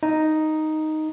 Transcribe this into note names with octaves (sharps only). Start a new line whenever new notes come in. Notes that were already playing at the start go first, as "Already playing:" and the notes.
D#4